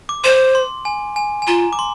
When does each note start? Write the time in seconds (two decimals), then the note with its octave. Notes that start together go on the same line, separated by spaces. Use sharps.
0.09 D6
0.24 C5 C6
0.55 C6
0.85 G#5
1.16 G#5
1.42 G#5
1.47 F4 A#5
1.73 D6
1.79 C6